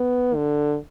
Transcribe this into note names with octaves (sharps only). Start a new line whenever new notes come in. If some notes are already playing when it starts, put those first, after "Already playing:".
Already playing: B3
D3